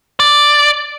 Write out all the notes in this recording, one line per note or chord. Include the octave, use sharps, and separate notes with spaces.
D5